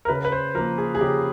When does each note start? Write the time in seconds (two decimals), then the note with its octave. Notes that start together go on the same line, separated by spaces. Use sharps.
0.05 A#4
0.08 C#3 B4
0.25 B4
0.32 C5
0.55 F3 A#3 A#4
0.78 G#4
0.95 G#4
1.01 C#3 G4